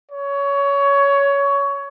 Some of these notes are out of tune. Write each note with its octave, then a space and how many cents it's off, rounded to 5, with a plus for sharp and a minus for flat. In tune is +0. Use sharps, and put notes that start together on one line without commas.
C#5 +20